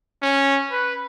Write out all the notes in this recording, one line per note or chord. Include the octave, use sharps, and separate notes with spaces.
C#4
B4